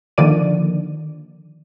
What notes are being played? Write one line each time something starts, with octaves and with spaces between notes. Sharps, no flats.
D3 D#3 F3 A#3 D5 D#7